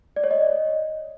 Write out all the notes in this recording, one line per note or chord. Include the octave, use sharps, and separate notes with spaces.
D5
C#5
D#5